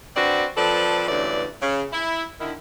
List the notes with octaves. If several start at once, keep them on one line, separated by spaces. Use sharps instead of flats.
D3 C4 F#4 B4 D5
F3 C4 A4 B4 D5
D2 G2 E3 C#4 D5
C#3
E4
D3 D#3 E4